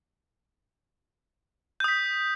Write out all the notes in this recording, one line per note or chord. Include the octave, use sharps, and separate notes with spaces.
D#6 G6 B6